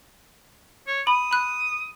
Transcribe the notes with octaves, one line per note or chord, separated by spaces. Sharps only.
C#5
B5 D#6
B5 F#6